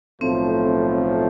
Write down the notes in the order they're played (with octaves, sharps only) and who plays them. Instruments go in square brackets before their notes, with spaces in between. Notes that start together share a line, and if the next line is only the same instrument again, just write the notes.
[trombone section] B1 A2 F3 A3 [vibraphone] C4